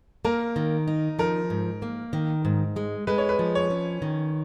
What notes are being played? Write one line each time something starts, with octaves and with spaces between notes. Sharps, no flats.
A#3 A#4
D#3
D#4
F3 A#4
G#2
A#3
D#3
G#2
G#3
G#3 B4
C#5
B4
F3
C#5
C#4
D#3